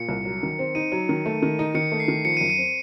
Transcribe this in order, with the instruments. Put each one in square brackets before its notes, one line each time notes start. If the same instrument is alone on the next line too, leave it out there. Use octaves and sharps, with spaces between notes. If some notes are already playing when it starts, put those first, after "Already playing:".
Already playing: [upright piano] A#2 [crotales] C#7
[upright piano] C2
F#3
D#3
C4
[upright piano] D#4 [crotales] D#7
[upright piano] F#3
D#3
A3
D#3
D#4
[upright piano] D#3 [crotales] C#7
[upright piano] A3
[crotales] C7
[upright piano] D#3
[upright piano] F3 [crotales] C#7
[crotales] D#7
[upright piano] F#2
[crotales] D#7
[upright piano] C4